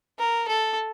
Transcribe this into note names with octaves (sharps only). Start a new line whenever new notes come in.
A#4
A4